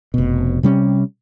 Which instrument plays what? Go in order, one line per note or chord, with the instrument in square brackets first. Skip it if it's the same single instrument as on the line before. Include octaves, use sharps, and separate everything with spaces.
[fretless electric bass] F1 B2
C3 G3 C#4